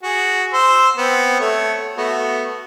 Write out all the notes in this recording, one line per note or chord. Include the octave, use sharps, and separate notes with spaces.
F#4 G#4
C5 E6
B3 C4
A3 C#5
A3 B3 F#4